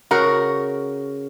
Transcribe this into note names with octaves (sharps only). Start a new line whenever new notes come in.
C#3 F#4 A#4 F#5